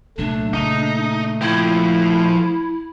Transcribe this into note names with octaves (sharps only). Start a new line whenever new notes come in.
C2 A#2 F#3 A3 D4
A#2 C#3 A#3 D#4
F3 E4 G5